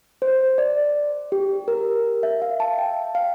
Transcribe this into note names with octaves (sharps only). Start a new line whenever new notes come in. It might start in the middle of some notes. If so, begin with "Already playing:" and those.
C5
D5
G4
A#4
E5
F5
A5
G5
F5